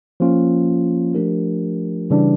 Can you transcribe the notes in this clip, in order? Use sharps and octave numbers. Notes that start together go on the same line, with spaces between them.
F3 A#3 C#4 F4
F3 A3 D4 G4 A#4
C#3 E3 G3 D4